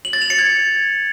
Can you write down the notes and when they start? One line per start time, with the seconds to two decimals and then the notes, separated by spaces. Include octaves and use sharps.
0.05 F#7
0.13 A6
0.22 F7
0.30 C#7
0.39 G#6